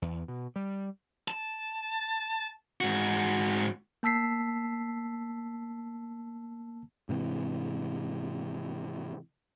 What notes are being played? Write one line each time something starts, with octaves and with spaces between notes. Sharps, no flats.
E2
B2
G3
A5
G#2 F#4
A#3 A5 E6 B6 C7
G#2 C3 E3